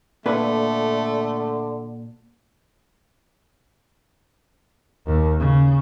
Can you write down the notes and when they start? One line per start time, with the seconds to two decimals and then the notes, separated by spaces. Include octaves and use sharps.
0.26 A#2 D3 A3 B4
5.06 D#2
5.39 C#3